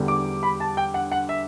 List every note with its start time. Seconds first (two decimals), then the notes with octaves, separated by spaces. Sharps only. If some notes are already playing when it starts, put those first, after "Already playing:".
Already playing: E2 D3 G3
0.08 D6
0.43 B5
0.60 A5
0.77 G5
0.94 F#5
1.12 F#5
1.29 E5